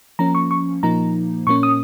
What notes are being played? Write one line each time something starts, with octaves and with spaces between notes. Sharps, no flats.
F3 A#3 C#4 A#5
C#6
C#6
A#2 F3 A#3 D#4 A#5
A#2 A#3 C#4 C#6
D#6